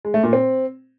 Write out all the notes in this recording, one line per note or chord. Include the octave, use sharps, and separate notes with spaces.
G#3
A3
A#2
C4